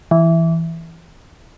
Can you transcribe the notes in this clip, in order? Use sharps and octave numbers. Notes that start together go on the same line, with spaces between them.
E3